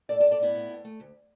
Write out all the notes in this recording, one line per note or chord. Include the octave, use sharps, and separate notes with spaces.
A2 A4 D5
A4 D5
A2
A4 D5
A2 B3 E4
A2
A2
A3
D2